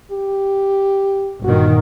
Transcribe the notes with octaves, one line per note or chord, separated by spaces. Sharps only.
G4
G1 A#2 D#3 F#4